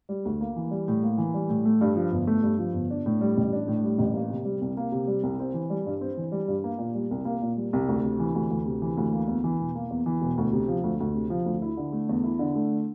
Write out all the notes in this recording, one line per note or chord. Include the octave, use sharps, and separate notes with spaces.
G3
D2
A#3
E3
G3
A2
A#3
E3
G3
A2
A3
G2
F3
G1
A3
G2
F3
G1
D4
A2
G3
A1
D4
A2
G3
A1
A#3
C3
G3
C2
A#3
C3
G3
C2
C4
E3
G3
G2
C4
E3
G3
G2
A#3
A#2
G3
C2
A#3
A#2
G3
C2
D2
C3
E3
D2
D2
C3
E3
D2
A#3
E2
E3
E1
A#3
E2
E3
E1
D2
C3
F3
D2
D2
C3
F3
D2
E4
D3
A3
E2
E4
D3
A3